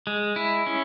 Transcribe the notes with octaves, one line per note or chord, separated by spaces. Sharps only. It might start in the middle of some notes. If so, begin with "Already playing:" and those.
G#3
E4
C#4